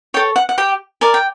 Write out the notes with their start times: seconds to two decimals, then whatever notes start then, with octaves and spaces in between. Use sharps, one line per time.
0.14 A4 C#5 G5
0.36 F#5
0.49 F#5
0.58 G4 G5
1.01 A#4 D5 G#5
1.14 G5